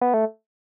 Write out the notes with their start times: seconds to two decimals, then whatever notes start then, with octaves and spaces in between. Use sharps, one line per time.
0.01 B3
0.14 A3